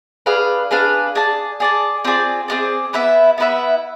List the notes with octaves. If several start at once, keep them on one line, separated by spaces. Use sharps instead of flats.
D4 G#4 B4 F5
D4 G#4 B4 F5
G#4 D5 A5
G#4 D5 A5
C4 F4 G#4 D5
C4 F4 G#4 D5
B3 E4 B4 E5
B3 E4 B4 E5